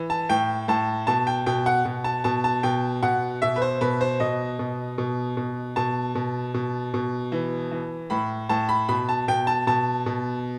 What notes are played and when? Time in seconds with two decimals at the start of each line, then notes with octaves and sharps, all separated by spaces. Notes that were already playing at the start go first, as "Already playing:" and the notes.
Already playing: E3
0.10 A5
0.29 A2 G5
0.68 A2 A5
1.07 B2 A5
1.27 G5
1.46 B2 G5
1.66 F#5
1.85 B2
2.04 A5
2.24 B2 A5
2.44 A5
2.63 B2 G5
3.03 B2 F#5
3.42 B2 E5
3.56 B4
3.62 C5
3.81 B2 B4
4.01 C5
4.20 B2 D#5
4.59 B2
4.98 B2
5.37 B2
5.76 B2 A5
6.15 B2
6.54 B2
6.94 B2
7.32 E3
7.71 E3
8.10 A2 B5
8.49 A2 A5
8.69 B5
8.89 B2 B5
9.09 A5
9.28 B2 G5
9.47 A5
9.67 B2 A5
10.06 B2